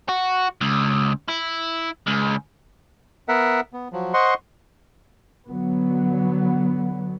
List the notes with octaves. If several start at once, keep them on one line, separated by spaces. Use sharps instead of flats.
F#4
C#2
E4
C#2
B3 A#4 E5 F#5
B3
F3 F#3
C5 D#5 F#5 C6 C#6
D3 F#3 B3